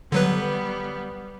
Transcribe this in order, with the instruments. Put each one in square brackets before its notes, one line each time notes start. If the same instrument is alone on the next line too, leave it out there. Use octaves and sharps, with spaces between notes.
[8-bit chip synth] D3 F#3 B4 [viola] G3 B3